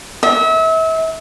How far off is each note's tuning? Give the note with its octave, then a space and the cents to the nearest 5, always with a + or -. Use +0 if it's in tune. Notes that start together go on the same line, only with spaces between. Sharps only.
E5 -35